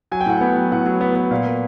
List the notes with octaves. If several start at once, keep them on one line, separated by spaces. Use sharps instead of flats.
F#3 G#5
G5
A2 F#5
B3 G5
F#3
A2 F#5
F#3
B3
B3
A#2 F5
A#3